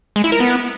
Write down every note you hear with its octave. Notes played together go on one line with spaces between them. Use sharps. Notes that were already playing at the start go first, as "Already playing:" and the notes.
G#3
E4
A#4
B3